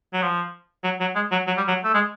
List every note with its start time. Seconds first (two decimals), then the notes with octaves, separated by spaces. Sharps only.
0.13 F#3
0.22 F3
0.84 F#3
1.00 F#3
1.15 G#3
1.32 F#3
1.47 F#3
1.57 G3
1.68 F#3
1.84 A3
1.94 G#3